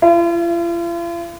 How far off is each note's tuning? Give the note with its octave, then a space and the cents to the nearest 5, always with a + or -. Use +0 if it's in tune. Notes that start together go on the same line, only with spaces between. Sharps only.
F4 -45